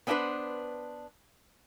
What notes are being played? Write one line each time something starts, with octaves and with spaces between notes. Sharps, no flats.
B3 C#4 D4 E4 B4 C5